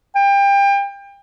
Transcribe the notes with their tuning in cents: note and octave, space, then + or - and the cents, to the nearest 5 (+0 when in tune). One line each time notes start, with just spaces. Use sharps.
G5 +30